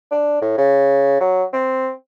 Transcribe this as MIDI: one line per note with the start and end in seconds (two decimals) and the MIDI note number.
0.11 0.38 62
0.41 0.56 45
0.58 1.19 49
1.20 1.44 54
1.53 1.90 60